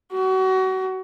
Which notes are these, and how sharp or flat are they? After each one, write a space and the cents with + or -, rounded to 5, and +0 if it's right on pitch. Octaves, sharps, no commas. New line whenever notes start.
F#4 +30